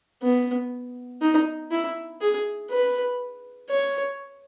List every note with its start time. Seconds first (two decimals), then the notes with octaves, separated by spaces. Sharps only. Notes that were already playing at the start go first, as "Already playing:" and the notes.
0.22 B3
1.22 D#4
1.71 E4
2.21 G#4
2.71 B4
3.70 C#5